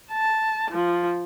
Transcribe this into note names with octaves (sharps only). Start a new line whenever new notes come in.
A5
F3